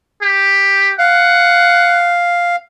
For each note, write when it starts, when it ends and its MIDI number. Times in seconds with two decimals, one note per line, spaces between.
0.22 0.91 67
0.99 2.56 77
0.99 2.17 78